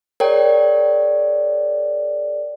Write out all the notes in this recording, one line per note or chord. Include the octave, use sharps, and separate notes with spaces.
G#4 A#4 C#5 D5 G5